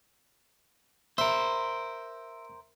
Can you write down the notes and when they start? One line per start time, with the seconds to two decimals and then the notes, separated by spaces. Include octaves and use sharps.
1.18 A#4 C5 E5